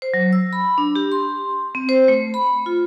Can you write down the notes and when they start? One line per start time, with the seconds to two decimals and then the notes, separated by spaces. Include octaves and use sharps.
0.02 C5
0.14 F#3
0.33 E6
0.53 B5
0.78 D4
0.96 G4
1.12 C6
1.75 C4
1.89 C5
2.08 A3
2.34 B5
2.66 F4